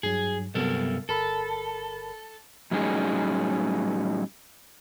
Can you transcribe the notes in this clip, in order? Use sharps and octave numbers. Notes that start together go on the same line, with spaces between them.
G2 F#3 G#4
G2 C3 F#3 B3 A4 A#4
G1 A4 A#4 B5
A2 F#3 G3 C#4 D#4 G#4